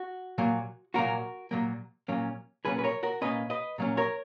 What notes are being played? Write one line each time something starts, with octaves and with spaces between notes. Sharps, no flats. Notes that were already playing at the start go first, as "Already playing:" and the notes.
Already playing: F#4
A#2 F#3 A#3
A#2 F#3 A#3 F#4 A#4
A#2 F#3 A#3
A#2 F#3 A#3 C#4
A#2 F#3 A#3 C#4 G#4 B4
B4
A#4 C#5
F#4 A#4
A#2 F#3 A#3 C#4 B4 D#5
B4 D#5
A#2 F#3 A#3 C#4
A#4 C#5